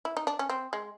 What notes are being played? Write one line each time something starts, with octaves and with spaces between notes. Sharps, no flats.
E4
D#4
D4
C#4
C4
G#3